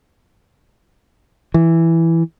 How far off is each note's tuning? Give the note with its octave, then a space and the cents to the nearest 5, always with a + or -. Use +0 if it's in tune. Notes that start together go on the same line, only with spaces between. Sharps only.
E3 +0